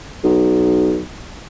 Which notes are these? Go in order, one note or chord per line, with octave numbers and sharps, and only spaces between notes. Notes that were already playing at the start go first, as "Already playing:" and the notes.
B1